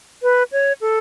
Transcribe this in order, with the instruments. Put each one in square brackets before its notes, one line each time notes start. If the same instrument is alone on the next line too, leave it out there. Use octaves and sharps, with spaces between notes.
[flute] B4
C#5
A4